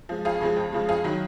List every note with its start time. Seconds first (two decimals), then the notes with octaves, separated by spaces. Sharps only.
0.09 F3 G#3
0.25 F2 F4 G#4
0.41 C#3 F3 G#3
0.56 F2
0.73 C#3 F3 G#3
0.88 F2 F4 G#4
1.04 D#3 F#3